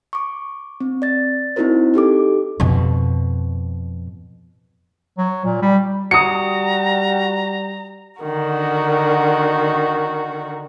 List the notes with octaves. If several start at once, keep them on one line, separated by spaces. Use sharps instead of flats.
C#6 D6
C4
D5 A6
C4 D#4 E4 F#4 A#4 C5
D#4 G4 A4 D6
F2 B2
F#3
A#2
G3
G3 F#4 A#5 D#6 C#7
D3 D#3 F#4 A#4